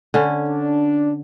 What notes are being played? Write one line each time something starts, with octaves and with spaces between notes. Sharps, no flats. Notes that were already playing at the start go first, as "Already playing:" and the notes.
D3 C#4
D4